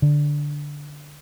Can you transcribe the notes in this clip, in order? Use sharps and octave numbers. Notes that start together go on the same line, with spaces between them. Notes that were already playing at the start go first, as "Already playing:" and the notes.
D3